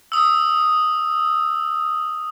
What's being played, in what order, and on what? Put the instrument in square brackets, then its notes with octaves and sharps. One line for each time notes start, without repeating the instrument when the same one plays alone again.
[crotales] D#6 E6